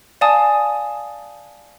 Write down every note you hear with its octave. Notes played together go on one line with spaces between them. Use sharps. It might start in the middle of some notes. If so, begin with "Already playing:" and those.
D5 F5 G#5 A5 D#6